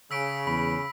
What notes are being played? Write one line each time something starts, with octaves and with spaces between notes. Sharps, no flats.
C#3 E6 B6 D7
E2 B5 B6